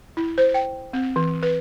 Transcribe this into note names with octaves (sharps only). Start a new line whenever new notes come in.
E4
C5
G5
C4
E3
B4